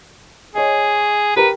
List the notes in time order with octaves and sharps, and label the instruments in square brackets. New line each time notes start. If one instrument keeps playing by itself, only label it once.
[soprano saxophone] G#4 [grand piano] C#5 D#5
[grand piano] G4 A#4 A#5 [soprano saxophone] B4